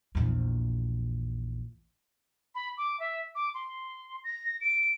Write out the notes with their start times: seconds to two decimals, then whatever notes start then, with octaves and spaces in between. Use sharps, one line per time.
0.15 A#1 E2
2.55 B5
2.77 D6
3.00 E5
3.35 D6
3.54 C6
4.24 A#6
4.61 D7